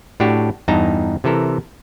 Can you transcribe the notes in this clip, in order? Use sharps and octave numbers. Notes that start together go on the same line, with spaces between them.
A2 D4 F#4 G4
E2 G2 D#4 A5 A#5
C3 E3 A4 A#4